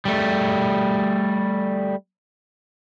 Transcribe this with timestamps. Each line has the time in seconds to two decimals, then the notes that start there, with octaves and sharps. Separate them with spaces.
0.05 G3 A3